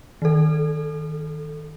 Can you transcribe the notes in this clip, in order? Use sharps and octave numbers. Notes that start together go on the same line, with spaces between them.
D#3 A4